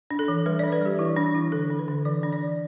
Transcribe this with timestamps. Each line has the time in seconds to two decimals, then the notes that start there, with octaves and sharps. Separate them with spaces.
0.11 D4
0.19 A4
0.28 E3
0.46 G3 B4
0.59 D5
0.64 D4
0.72 B4
0.81 G3 G4
0.99 E3 E4
1.17 D4
1.34 E3 E4
1.52 D3 A4
1.70 D4
1.79 B4
1.88 D3
2.05 E3 D5
2.23 D4
2.32 D5
2.41 E3